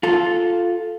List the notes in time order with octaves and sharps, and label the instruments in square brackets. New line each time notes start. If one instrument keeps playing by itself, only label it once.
[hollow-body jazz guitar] F4 A4